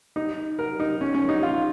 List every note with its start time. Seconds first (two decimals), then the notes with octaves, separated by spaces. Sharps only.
0.16 D#4
0.59 A#4
0.80 D#4
1.01 C#4
1.15 C#4
1.29 D#4
1.43 F4